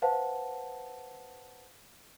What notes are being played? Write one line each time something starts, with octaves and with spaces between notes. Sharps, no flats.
B4 C5 F5 F#5 A5